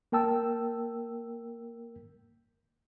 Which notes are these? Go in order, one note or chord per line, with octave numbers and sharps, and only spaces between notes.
A#3 A#4 G5 A5 E6